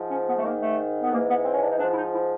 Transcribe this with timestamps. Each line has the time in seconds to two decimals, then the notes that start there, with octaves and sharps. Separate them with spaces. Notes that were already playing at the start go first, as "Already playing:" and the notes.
Already playing: G#2 F3
0.10 C#4
0.27 B3
0.37 A3
0.43 G#2 D#3 A#3
0.61 A3
1.03 B3
1.11 G#2 A#3
1.14 E3
1.28 B3
1.45 C4
1.54 C#4
1.62 D4
1.71 D#4
1.78 G#2 F3 D4
1.91 E4
1.96 D#4
2.13 E4